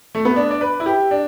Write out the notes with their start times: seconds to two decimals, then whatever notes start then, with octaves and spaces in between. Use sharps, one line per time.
0.15 A3
0.25 B3
0.36 D4
0.51 D5
0.61 B4
0.80 E4
0.86 G4
1.11 D4